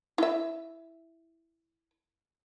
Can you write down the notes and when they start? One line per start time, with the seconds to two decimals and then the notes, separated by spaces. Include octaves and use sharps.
0.18 E4 E5